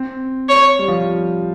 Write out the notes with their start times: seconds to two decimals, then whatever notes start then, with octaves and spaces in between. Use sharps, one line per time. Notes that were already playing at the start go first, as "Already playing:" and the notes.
Already playing: C4
0.49 C#5
0.79 G3
0.88 F3